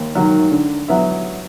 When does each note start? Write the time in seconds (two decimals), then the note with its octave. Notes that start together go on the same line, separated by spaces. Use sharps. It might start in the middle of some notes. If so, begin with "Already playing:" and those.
Already playing: D#2
0.15 D#3 F#3
0.51 D3
0.88 F#3 B3 E4